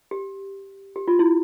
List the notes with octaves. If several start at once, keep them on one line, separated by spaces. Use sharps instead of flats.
G4
G4
F4
E4